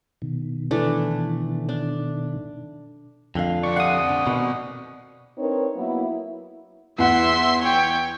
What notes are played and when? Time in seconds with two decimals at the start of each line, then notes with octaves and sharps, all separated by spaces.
0.22 B2 D#3
0.71 E3 A3 D4
1.69 D4
3.35 F2 D3 F4 F5
3.63 C4 D5 C#6
3.76 G4 F5 F#5 D#6
4.09 D3
4.27 B2 D#3
5.37 C4 D4 D#4 A#4 B4 C#5
5.75 F#3 A#3 B3 E4
6.99 E2 E5 F#5 C6
7.62 C#5 G5